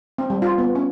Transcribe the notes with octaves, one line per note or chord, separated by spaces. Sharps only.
C4
G3
F4
B3
C#4